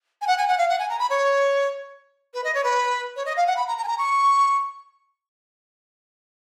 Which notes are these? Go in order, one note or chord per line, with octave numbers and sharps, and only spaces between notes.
G#5
F#5
G#5
F#5
F5
F#5
G#5
A#5
B5
C#5
B4
D#5
C#5
B4
C#5
D#5
F5
F#5
B5
A#5
A#5
G#5
A#5
C#6